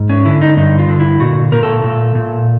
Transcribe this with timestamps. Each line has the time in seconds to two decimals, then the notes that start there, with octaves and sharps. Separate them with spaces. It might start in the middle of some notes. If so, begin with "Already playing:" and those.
Already playing: G#2
0.09 C#4
0.25 D3 E4
0.41 D#4
0.57 G2 D#4
0.79 F4
0.89 D3
1.00 E4
1.20 A#2 F#4
1.52 A#2 A#4
1.63 A4
1.84 A#2
2.15 A#2